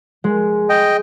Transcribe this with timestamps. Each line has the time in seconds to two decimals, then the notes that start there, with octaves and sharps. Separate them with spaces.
0.24 G#3
0.70 D#5 G5